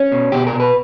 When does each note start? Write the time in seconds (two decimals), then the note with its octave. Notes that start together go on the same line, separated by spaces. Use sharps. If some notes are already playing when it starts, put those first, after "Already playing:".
Already playing: C#4
0.12 B2
0.32 B2 G4
0.47 A#4
0.53 B2
0.60 B4